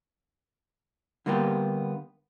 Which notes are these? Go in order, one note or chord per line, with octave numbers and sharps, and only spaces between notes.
D3 G3 A#3 B3 G4